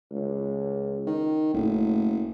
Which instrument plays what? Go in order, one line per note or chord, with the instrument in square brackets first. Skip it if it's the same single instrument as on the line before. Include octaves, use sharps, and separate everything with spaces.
[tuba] C#2
[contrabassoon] D#3
[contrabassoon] F#1 [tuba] A2